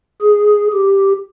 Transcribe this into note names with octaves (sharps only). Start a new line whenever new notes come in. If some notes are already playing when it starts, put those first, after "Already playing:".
G#4
G4